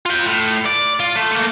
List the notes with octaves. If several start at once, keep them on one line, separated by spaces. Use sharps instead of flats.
F4 G5
A2
D5
F4
A3
A3 A#3